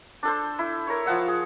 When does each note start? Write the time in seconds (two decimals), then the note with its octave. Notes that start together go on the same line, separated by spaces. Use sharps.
0.23 D4 A4 C5
0.59 E4
0.87 A#4 C#5
1.06 F3 F5 F#5 E6
1.28 G#4